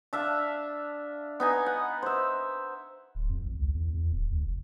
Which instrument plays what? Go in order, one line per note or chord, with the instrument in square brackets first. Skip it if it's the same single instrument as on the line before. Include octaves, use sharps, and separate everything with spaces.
[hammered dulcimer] D4 E5 F5 A5
B3 D#4 G#5
F#5
C5 E5
[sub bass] D1
F2
A1
C#2
E2
E2
D1
D2
F1